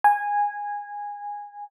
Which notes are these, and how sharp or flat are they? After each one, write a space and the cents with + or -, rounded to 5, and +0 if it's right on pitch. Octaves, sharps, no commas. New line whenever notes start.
G#5 -15